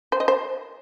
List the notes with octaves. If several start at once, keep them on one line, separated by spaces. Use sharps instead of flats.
C5
D#5
C5